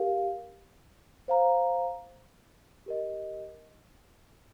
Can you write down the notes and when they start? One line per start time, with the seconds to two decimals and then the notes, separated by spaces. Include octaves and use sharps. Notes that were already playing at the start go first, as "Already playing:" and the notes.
Already playing: G4 A#4 F5
1.28 C5 F5 A#5
2.86 G4 A#4 D#5